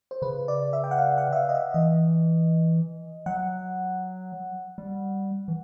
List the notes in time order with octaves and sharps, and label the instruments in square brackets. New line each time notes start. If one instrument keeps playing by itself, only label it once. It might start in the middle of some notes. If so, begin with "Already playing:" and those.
[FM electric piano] C5
[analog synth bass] C#3 [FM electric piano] B4
[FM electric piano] D5
E5
G5
F#5
F5
F#5
E5
F5
D#5
E5
[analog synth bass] E3 [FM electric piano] D#5
[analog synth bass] F#3 [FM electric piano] F#5
[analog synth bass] G3
E3